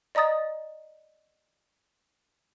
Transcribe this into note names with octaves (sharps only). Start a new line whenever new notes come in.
D5 D#5 A#5 D#6 A6